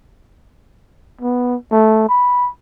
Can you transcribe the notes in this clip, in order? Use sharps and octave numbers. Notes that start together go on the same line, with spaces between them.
B3
A3
B5